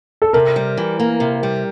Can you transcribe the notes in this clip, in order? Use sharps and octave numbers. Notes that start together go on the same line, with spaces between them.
A4
C3 A#4
G3
E3
A#3
C3
G3